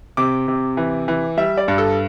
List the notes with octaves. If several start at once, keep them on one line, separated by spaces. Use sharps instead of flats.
C3 D6
C3
E3
E3
G3 E5
D5
G2
A4